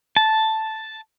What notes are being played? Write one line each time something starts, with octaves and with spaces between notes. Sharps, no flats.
A5